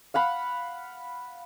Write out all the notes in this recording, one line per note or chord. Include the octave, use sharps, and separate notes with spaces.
F5 F#5 B5